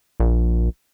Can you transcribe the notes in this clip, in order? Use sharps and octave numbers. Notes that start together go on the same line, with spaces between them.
A#1